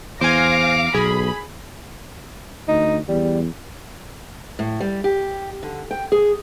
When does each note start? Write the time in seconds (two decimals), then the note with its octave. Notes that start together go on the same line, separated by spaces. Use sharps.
0.21 E2 C5 F5 G#5 D6 F6 A#6
0.94 B1 G#4 B5
2.68 D2 D#4
3.08 E2 G3
4.59 A2
4.80 G3
5.04 G4
5.63 D3
5.91 G5
6.12 G#4